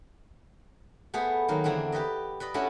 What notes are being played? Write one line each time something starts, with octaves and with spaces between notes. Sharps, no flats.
A3 B3 G#4 B4 C5
D#3 F#3 A#3
E2 D3 C4 D4 E4
G4 B4 D5 D#5
B4 D5 D#5 B5
A3 C#4 D4 E4 F#4 A4